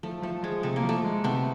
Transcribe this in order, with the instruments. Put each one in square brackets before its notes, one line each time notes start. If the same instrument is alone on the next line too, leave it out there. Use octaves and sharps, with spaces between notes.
[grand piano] F3 [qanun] A3
[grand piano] F3 [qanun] A3
[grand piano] F3 [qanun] G#3
[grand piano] C3 [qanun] A3
[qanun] A#3
[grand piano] F3
[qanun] A3
[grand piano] G#3
[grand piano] C3 [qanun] A3 B3